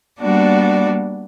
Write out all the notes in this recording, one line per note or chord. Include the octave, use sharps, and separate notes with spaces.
G3 A#3 B3 D4 F#4 D5